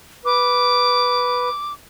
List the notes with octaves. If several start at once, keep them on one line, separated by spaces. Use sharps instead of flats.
B4 D6